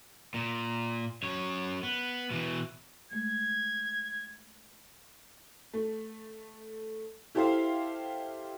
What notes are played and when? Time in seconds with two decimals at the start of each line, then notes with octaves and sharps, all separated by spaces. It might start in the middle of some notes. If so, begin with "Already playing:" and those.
0.34 A#2
1.23 F#2 C#5
1.83 B3
2.31 B2 E3
3.11 G#3 A3 G#6
5.73 A3
7.35 E4 G4 A4 C5 E5 F5